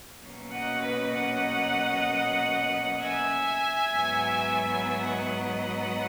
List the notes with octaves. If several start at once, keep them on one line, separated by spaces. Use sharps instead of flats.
B2 F#3 A#3 C#4
D#5 F#5
B4 D#5
D#5 F#5
E5 G#5
G#2 F#3 B3
D#5 F#5